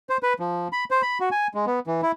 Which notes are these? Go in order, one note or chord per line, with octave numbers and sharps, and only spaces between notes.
C5
B4
F3
B5
C5
B5
F#4
G#5
G#3
B3
E3
E4